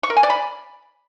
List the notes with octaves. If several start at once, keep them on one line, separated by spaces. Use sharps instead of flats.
C#6
A#4
G#5
D5
B5